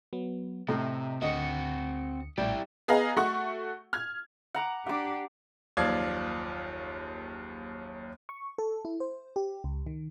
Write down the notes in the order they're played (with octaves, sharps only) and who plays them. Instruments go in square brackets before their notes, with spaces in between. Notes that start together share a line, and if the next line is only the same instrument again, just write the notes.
[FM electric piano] F#3 B3
[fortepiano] A2 [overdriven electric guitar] C3 [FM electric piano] D#5 A#5
[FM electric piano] D2 D3 C#7 [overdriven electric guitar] C4 F#4 [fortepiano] D#5
[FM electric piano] A#1 A2 G5 [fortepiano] G3 [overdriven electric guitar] E4 G4
[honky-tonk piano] B3 G#4 D#5 F5 A#5
A3 F#4 F#5 C#6
F6 G#6
[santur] F#5 A#5 D6
[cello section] D4 G4 [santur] F#5 D6
[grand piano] F#1 D#2 F3 D5 F5 G#6
[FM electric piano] C#6
A4
E4
C5
G4
C#2
D#3